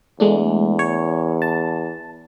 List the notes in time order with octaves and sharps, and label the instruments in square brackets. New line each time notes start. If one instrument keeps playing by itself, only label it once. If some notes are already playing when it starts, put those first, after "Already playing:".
[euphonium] E2 [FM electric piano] G#3 A3 D4
[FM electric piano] C#5
A5